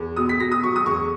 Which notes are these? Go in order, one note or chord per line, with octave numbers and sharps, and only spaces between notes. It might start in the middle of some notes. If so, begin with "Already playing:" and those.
Already playing: E2
B2 D#6
B6
B2 A#6
D#6
F#3 C#6
D#6
E2 C#6